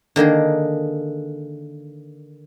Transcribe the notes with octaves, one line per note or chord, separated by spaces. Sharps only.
D3 D#3 A#3 G#4